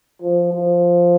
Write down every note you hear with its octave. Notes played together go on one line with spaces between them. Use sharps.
F3
F3